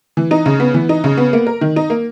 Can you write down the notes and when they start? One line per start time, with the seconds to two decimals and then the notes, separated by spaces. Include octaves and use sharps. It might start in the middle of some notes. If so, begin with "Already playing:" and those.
0.17 E3
0.31 D#4
0.46 C#3
0.60 B3
0.74 E3
0.89 D#4
1.04 C#3
1.17 B3
1.33 A#3
1.47 A#4
1.61 D#3
1.76 D#4
1.90 A#3